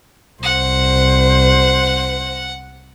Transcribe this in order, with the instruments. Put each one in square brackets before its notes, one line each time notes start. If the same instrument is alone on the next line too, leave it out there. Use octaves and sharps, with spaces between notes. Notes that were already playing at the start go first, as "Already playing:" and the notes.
[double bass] C2 [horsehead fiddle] C5 [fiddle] F#5